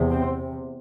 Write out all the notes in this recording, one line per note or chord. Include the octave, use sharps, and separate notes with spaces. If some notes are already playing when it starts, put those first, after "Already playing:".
Already playing: E2 C3
C4